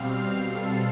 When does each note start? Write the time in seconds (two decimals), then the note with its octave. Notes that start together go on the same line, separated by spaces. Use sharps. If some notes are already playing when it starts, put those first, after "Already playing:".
Already playing: B2 G3 C4 F5
0.52 A4